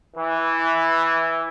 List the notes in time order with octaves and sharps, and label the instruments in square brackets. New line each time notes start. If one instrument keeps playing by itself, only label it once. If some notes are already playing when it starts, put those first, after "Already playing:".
[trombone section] E3